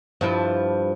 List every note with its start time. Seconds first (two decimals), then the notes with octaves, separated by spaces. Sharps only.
0.21 G2 F3 E4